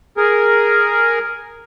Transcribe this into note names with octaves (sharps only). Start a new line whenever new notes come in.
G#4 A#4